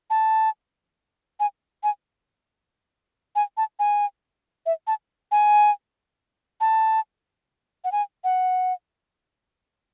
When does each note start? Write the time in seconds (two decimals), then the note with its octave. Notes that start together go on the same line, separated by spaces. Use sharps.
0.10 A5
1.40 G#5
1.83 G#5
3.36 G#5
3.57 A5
3.79 G#5
4.66 E5
4.87 A5
5.32 G#5
6.61 A5
7.84 F#5
7.92 G#5
8.24 F#5